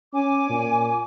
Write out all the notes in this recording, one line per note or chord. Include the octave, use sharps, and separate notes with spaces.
C#4 G#5 D6
A#2